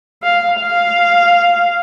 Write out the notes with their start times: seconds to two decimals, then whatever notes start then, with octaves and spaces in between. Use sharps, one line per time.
0.23 F5
0.61 F5